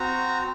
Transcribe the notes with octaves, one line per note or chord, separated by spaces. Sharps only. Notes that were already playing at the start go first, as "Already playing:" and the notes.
Already playing: C4 F#4 A#5